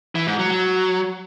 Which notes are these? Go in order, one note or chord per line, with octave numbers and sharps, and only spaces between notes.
E3
G#2
F#3
F#3